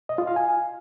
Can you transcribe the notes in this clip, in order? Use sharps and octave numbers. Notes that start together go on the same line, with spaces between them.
D#5
F4
F5
G#5